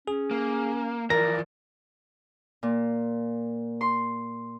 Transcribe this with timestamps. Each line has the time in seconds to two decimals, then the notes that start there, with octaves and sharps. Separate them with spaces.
0.08 C#4 G#4
0.31 A#3
1.10 E3 F3 A#4 D5 A#6
2.63 A#2
3.81 C6